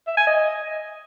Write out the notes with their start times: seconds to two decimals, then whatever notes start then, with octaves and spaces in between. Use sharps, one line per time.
0.07 E5
0.17 G#5
0.27 D#5